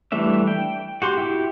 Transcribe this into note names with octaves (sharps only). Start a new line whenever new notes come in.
E3 G3 A3 D4 E5
G5
F#4 G4 C6
E4 F#4 G4